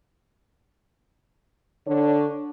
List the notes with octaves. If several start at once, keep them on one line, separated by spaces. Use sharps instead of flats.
D3 D4 C#5